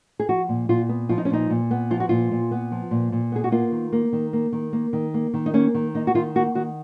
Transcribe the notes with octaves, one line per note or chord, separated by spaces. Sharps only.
G#4
F3 F#4
A#2
A#2 F4
B3
F3 F4
D#4
C#4
A#2 D#4
A#2
B3
F3 F4
F#4
A#2 F4
A#2
B3
F3
A#2
A#2
B3 G#4
F#4
A#3 F4
D#3
A#3
D#3
A#3
D#3
A#3
D#3
A#3
D#3
D#4
A#3 C#4
D#3
A#3 D#4
F#4
D#3 F4
A#3 F#4
D#3 F#4